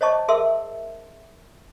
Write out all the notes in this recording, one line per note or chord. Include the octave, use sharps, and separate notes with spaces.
C5 C#5 D#5 A5 C#6
G#4 A#4 E5 C6 E6